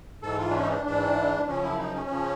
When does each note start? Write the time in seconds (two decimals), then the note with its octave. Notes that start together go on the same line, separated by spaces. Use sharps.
0.22 G#2 E3 A4
0.38 F4
0.50 D4
0.54 C#4
0.62 D#4
0.69 D4
0.85 G#2 E3 D4
1.47 F#2 C#3 F3 C#4
1.62 E4
1.79 D#4
1.94 C#4
2.09 C#3 F3